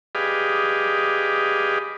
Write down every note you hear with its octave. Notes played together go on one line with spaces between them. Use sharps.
G4 G#4 B4 D5 D#5 F5